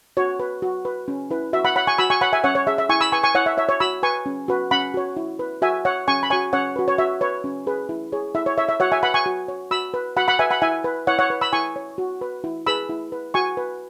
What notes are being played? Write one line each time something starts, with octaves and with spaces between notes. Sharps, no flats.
F#4 C#5
B4
F#4
B4
C#4
E4 B4
F#4 E5
F#5 B5
C#5 F#5 B5
G#5 C#6
F#4 B5 E6
G#5 C#6
C#5 F#5 B5
E5 G#5
C#4 C#5 F#5
C#5
G#4 C#5 E5
E5
E4 G#5 C#6
B5 E6
B4 G#5 C#6
G#5 C#6
E4 C#5 F#5
E5
C#5 E5
C#5
F#4 B5 E6
B4 G#5 C#6
C#4
F#4 B4
C#4 F#5 B5
F#4 C#5
E4
B4
F#4 E5 G#5
C#5 F#5
C#4 G#5 C#6
B5
F#4 C#5 G#5 C#6
C#4 C#5 F#5
F#4 B4
C#5
F#4 E5
B4 C#5
C#4
G#4 B4
E4
G#4 C#5
E4 E5
C#5
C#5 E5
E5
F#4 C#5 F#5
E5 G#5
B4 F#5 B5
G#5 C#6
F#4
C#5
F#4 B5 E6
B4
F#4 F#5 B5
F#5 B5
B4 E5 G#5
F#5 B5
E4 E5 G#5
B4
E4 C#5 F#5
C#5 F#5
B4
B5 E6
E4 G#5 C#6
C#5
F#4
B4
E4
G#4 B4 B5 E6
E4
B4
F#4 G#5 C#6
B4